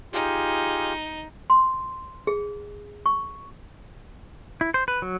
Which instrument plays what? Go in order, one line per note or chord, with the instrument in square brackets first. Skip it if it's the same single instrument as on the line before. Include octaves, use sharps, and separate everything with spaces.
[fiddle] D#4 [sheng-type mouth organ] F4 G4 G#4
[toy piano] C6
G#4
C#6
[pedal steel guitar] E4
C5
B4
F#3